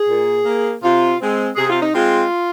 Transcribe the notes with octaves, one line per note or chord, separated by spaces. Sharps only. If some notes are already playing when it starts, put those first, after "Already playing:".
Already playing: G#4
A#2
A#3
C3 F4
G#3 C4
C3 G#4
F4
D#4
G#3 C4 F4